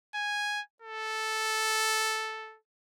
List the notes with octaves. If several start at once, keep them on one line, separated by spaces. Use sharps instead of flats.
G#5
A4